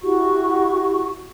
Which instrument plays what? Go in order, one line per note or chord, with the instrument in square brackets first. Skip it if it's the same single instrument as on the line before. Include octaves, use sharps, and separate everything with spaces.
[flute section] E4 F#4 G4 C#6